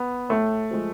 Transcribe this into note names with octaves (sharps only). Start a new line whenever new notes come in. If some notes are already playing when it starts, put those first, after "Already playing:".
Already playing: B3
A2 A3
F3 G#3